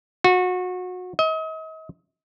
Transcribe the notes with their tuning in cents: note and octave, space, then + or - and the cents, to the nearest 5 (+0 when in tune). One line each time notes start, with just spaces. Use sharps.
F#4 -25
D#5 +40